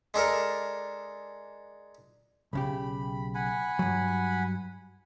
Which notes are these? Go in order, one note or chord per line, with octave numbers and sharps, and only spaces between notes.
G#3 D4 A4 A#4
B1 C#3 G4 B5
F#5 G#5 B5
G2 F#3